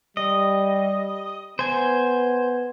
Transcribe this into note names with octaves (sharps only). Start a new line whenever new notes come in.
G3 D#5
B3 C5 G#5